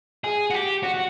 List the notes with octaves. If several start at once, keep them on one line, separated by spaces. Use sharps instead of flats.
G#4
F#4
G4
F#4
F#4